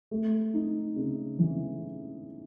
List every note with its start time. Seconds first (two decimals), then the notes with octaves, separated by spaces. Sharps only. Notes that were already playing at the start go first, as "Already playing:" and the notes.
0.11 A3
0.54 D#4
0.96 C#3
1.39 E3